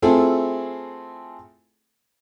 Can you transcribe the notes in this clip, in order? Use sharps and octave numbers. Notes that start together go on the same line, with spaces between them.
A3 C4 E4 F4 G#4 A4